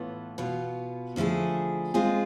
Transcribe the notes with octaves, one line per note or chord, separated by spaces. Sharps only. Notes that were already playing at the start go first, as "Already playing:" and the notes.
Already playing: A2 E3 B3 F4 A4
B2 B3 F4
D3 F3 A3 E4 G#4
G#3 C4 F4 G#4